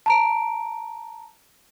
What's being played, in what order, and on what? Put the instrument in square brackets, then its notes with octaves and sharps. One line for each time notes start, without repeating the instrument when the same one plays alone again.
[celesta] A5 A#5 D7